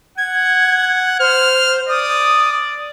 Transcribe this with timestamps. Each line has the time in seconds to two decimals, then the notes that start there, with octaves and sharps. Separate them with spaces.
0.18 F#5 G#6
1.20 C5 F6
1.88 D5 D#6